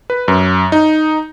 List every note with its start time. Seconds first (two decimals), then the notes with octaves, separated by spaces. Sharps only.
0.10 B4
0.28 F#2
0.72 D#4